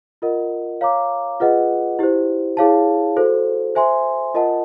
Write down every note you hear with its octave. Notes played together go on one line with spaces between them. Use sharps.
F4 A#4 D#5 F#5
C#5 F5 A#5 D6
F4 G#4 B4 D#5 F#5
E4 G4 C5
E4 G#4 C#5 F5 A5
F#4 A4 C5
C5 E5 G#5 C6
F4 A#4 D#5 F#5 A5